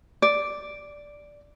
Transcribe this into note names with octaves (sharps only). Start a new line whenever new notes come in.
D5